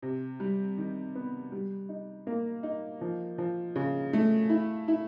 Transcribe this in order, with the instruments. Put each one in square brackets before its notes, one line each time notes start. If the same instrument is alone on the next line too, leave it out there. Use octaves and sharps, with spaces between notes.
[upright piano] C3
G3
D#3
B3
G3
D#4
A#3
D#4
F3
F3
C#3
A3
E4
E4